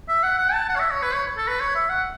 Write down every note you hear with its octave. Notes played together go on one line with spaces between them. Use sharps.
E5
F#5
F#5
A5
F#5
C#5
E5
C#5
B4
C#5
A4
B4
C#5
E5
F#5